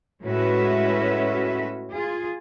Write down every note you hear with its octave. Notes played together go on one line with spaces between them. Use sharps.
A2 G#3 C#4 F#4 B4 E5
F4 G#4